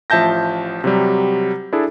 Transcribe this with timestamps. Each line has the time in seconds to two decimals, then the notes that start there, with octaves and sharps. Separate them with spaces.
0.10 A1 F3 E5 A5 G6 A#6
0.84 C3 F#3 G3
1.72 D4 E4 G#4 A4